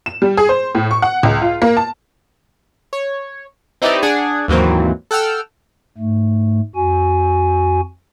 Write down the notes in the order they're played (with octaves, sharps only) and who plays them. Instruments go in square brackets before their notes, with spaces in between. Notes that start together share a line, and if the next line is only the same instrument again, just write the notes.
[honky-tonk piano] E7
G3
G#4
C5
A2
C#6
F#5
C#2
F4
A#3
A5
[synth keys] C#5
C4 D#4 E4 G4 B4 D5
D4 G#4 F#5 G#5
D#2 G#2 E3 F#3 A#3 C4
A4 F#5 G5 E6 F6
[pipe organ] G#2 A3
F2 F#4 G#5